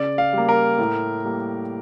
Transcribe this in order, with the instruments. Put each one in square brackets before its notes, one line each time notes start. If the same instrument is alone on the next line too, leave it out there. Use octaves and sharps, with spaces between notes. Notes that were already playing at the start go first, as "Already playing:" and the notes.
Already playing: [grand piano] C#3 D5
F5
G3 A#3
A#4
A2
G3 A#3